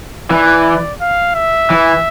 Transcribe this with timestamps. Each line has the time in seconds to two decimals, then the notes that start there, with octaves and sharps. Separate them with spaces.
0.30 E3 D5
1.01 F5
1.35 E5
1.70 E3